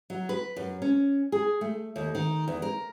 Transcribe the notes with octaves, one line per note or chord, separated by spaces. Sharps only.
F#3
B4
F#2
C#4
G#4
A3
D#2
D#3
E2
A#4